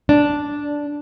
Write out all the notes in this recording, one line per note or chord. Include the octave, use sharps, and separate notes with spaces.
D4